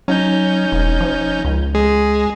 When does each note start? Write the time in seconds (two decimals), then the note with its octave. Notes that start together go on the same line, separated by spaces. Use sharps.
0.08 F#3 C#4 D#4 G6
0.72 E1
1.01 F3
1.45 C#2
1.75 G#3 G#4